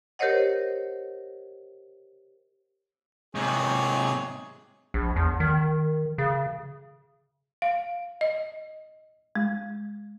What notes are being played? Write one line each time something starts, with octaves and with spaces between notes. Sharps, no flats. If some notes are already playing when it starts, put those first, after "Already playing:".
G4 A#4 C5 C#5 D#5 F#5
G#2 C3 G#4 C#5
A#1
E2
D#3
C#3
F5
D#5
G#3